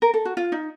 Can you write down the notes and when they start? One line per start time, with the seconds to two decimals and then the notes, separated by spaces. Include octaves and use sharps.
0.02 A#4
0.14 A4
0.25 F#4
0.37 F4
0.52 D#4